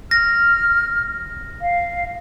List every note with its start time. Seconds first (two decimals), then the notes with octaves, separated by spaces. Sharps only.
0.11 F6 A#6
1.62 F5